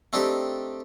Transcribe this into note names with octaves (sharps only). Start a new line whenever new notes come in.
A3 C4 D4 D#4 G4